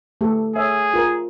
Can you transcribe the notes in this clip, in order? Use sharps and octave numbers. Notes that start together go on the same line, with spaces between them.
A3 G4 A4
G#4 C#5 E5
F4 A#4